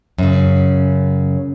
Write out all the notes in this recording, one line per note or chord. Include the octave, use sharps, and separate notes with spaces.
F#2 C#3